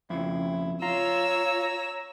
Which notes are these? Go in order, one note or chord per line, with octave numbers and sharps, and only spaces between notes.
F2 C#3 E4
F4 C#5 A#5 E6